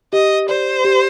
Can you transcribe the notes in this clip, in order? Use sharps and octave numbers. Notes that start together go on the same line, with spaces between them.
G4 D#5
C5 D5
G4